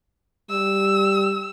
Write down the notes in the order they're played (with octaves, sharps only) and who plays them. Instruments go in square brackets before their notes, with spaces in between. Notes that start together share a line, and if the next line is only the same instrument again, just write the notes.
[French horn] G3 [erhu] E6